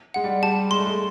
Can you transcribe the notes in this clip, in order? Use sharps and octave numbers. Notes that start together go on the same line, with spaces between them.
G#3 F#5
G3
G3 A5
G#3 C6
A3
G#3